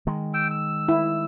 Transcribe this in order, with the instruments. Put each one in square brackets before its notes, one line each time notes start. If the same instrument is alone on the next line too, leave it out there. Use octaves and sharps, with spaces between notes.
[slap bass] D#3 G#3
[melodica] G5 E6
E6
[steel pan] E4